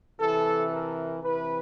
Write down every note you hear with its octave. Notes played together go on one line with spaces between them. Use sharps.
C3 E3 A4
A#4
C3 E3 B4